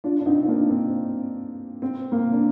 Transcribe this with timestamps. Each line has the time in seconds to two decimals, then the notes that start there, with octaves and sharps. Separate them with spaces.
0.04 D4 F4
0.20 D4
0.26 C4 D#4
0.43 D#4
0.48 A#3 D4
0.70 C4
1.82 C4
2.12 A#3
2.32 D4